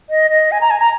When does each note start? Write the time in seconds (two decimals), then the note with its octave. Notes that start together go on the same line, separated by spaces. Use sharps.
0.10 D#5
0.31 D#5
0.52 G#5
0.61 A#5
0.71 G#5
0.80 A#5